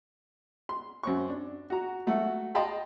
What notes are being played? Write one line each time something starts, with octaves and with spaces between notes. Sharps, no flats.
C6
F#2 C4 C#6
D4
F#4 A#5
F#3 A3 F#4 F#5
D#5 F5 G5 A5 B5 C6